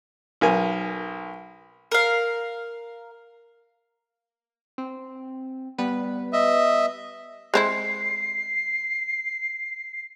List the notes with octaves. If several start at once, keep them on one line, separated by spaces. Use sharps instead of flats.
B1 A#4 G#5
A#4 F5
C4
G3 B3 B4
D#5 E5
G#3 C4 E4 C7